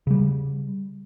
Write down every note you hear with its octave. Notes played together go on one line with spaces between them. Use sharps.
C#3 G3